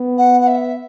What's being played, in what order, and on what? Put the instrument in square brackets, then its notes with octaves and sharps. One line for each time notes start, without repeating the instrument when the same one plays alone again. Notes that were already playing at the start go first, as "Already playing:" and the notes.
Already playing: [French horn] B3
[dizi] F#5
F#5
E5